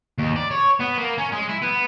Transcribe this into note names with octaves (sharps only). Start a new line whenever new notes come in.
D#2
D5
C#5
B3
A#3
C#4
G#3
E4
B3